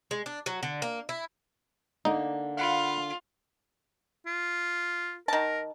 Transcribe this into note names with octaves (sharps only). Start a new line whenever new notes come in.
G#3
D4
F#3
D3
A#3
E4
D3 A#3 D4 D#4
F4 F5 F#5 B5
F4
D#3 A#4 A5